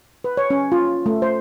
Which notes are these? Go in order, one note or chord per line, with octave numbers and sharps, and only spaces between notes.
B4
C#5
C#4
F4
A3
C5